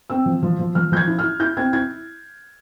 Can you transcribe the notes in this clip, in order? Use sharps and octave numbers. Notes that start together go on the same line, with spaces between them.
C4 E6
F3
F3
F3
F3 F6
F3 G6 G#6
E4
E4 F6
E4 G6
C4 G#6
E4 G#6